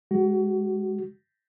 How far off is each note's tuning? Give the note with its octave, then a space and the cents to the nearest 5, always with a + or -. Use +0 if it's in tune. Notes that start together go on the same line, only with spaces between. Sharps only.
G#3 -10 F#4 +30